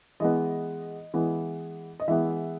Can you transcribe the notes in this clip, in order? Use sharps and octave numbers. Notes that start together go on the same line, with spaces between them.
E3 G#3 B3 D#5
E3 G#3 B3
D#5
E3 G#3 B3 E5